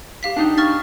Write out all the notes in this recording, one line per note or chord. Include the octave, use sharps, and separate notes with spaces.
G4 F5 B6
D4 D#4 G5
C#6 F6 A6